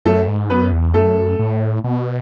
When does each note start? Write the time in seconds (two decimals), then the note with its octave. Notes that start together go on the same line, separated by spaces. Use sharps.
0.05 F#2 A3 A4
0.28 G#2
0.50 F#2 B3 B4
0.72 E2
0.94 F#2 A3 A4
1.39 A2
1.84 B2